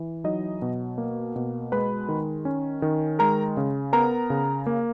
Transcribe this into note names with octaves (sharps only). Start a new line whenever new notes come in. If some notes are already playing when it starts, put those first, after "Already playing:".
Already playing: E3
F#3 D#4 D#5
B2
A#3
B2
G#3 B4 B5
D#3
C#4
D#3
G#3 A#4 A#5
C#3
B3 A#4 A#5
C#3
A#3